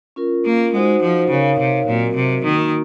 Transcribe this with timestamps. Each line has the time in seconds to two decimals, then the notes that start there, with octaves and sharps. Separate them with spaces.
0.16 C#4 F4 A#4
0.45 A#3
0.74 G#3 D#4 F#4 C5 D#5 F#5
1.02 F3
1.30 C#3 D#4 A#4 C#5 F5
1.59 C3
1.87 A#2 F#3 C4 F#4 A#4 D#5
2.15 C3
2.44 D#3 A#3 D#4 F#4